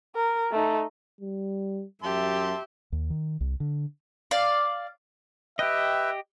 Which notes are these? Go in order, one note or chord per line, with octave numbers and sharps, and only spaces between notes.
A#4
A3 D#4
G3
F#2 G4 E5 A5 C6
D#2
D#3
C2
D3
D5 F5
G4 B4 D#5 E5 G5